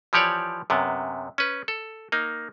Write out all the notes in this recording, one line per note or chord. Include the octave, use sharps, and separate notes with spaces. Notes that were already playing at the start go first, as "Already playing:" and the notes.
E3 F3 G4 C#5 D5
F#2 C3 B3
C#4 B4
A4
A#3 D#4